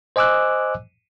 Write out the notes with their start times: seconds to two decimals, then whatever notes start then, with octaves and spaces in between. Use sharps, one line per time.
0.16 C5 D#5 G#5 D6 E6 F#6